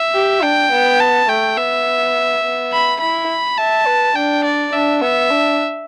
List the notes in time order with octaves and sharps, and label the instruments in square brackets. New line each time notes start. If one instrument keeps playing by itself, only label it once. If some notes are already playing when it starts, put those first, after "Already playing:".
Already playing: [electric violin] E5
[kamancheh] G4
[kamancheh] D4 [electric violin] G5
[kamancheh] B3
[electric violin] A5
[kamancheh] A3 [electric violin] G5
[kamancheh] B3 [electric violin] E5
[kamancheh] B3
[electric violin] B5
[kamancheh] E4 [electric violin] B5
[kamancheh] E5 [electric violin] A5
[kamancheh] B4
[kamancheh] D4 [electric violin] G5
[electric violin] D5
[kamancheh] D4 [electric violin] E5
[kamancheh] B3 [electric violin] E5
[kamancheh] D4